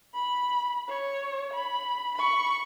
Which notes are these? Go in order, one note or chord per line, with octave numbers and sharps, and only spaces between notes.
B5
C#5
B5
B5 C#6